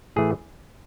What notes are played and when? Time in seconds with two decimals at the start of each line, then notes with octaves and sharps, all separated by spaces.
0.16 A2 E3 A3 G#4